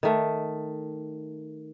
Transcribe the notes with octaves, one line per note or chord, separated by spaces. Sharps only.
D#3 A3